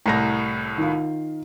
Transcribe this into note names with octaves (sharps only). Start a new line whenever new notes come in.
C2 A2 A#5 A#6
D#3 F4